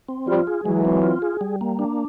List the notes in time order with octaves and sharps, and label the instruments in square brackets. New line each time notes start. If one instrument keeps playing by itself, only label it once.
[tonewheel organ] C4
[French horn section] F3 G3 [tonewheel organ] F4
[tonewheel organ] G#4
[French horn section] E3 F#3 [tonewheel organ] G#3
[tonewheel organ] C4
F4
G#4
G3
A#3
D4